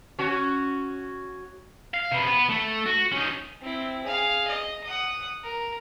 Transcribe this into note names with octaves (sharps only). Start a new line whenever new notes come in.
C#4 F#4
F5
C3 B3
B3 B4
A3
F#4
C#4 D#4
C4 E4
G#4 F5
D#5
F#5 D#6
A#4